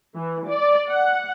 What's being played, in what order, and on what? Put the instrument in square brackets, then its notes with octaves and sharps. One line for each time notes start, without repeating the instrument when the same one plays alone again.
[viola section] E3
D5
F#5